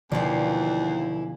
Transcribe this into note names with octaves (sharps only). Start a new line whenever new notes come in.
D#2 B2 D3 E3 F3 F4 D5